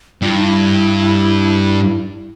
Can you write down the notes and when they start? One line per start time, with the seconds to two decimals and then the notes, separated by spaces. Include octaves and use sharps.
0.22 G2 F4
0.29 E4
0.36 D#4
0.43 E4